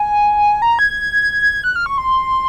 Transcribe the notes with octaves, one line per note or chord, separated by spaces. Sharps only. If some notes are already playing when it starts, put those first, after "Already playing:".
Already playing: G#5
A#5
G#6
F#6
F6
C#6
C6